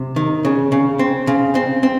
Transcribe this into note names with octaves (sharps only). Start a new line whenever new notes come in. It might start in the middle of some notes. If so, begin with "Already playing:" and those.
Already playing: C3
D#3
C#3
C#3
C4
C#3
C4
C4